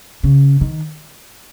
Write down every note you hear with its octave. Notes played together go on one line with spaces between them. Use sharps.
C#3
D#3